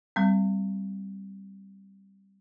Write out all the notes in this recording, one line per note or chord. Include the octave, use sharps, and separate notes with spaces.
G3 C4